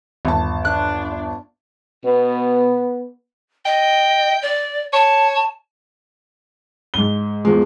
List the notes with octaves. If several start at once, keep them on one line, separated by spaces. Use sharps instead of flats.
G1 D#2 A5
D4 F#6
B2 B3
D#5 G5
D5
C#5 A5
G#2 G7
E2 F3 G#3